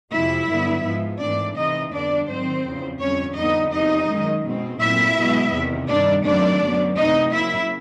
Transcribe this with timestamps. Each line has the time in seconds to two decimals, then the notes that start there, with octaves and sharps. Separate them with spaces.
0.11 F2 C3 F3 G#3 E4 E5
0.47 G2 D3 F#3 B3
0.83 G#2 F3 G#3 B3
1.19 G#2 E3 A3 C4 D4 D5
1.55 C3 E3 A3 C4 D#4 D#5
1.92 F2 D3 G3 B3 D4 D5
2.27 G#2 D#3 F#3 C4 C5
2.64 E2 C#3 F3
3.00 F2 D3 G3 C#4 C#5
3.36 F2 D3 G3 B3 D#4 D#5
3.72 E2 C3 F3 D#4 D#5
4.08 F#2 D#3 G#3
4.44 B2 G#3 C4
4.80 A#2 F#3 A3 C4 E4 E5
5.16 B2 G#3 B3
5.52 E2 C3 D#3
5.88 G2 D#3 G3 D4 D5
6.24 F#2 D#3 F#3 A3 C4 D4 D5
6.60 F#2 D3 F#3 B3
6.96 C3 E3 A3 C4 D#4 D#5
7.32 C#3 F#3 A#3 E4 E5